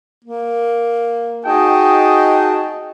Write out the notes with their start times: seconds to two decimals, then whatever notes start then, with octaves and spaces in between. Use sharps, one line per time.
0.24 A#3
1.45 D#4 F#4 G#4 D#5 G5 A5